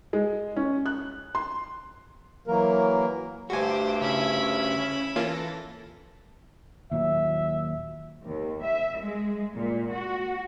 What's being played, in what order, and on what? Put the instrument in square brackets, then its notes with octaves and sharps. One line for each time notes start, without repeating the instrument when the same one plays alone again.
[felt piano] G#3
C#4
F#6
C6
[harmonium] E3 F#3 A#3 A#4
[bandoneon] D2 G2 [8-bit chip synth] F#4 G#5 [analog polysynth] G4 D6 [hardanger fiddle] C5
[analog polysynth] C#3 C#4 [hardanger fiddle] E4 B5
[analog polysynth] E3 A4 A#6 [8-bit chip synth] A#3 C#4 F4
[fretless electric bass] D#2 A#2 F#3 [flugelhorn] E5
[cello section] D#2
E5
G#3
A#2
F#4